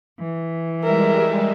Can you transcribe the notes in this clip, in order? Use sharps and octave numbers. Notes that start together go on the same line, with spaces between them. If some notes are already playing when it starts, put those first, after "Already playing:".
E3
G3 G#3 A#4 E5